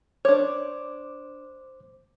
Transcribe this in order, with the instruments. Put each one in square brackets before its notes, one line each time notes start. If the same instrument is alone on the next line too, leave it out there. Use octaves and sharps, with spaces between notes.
[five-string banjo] D4 C#5 [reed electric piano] C5 D6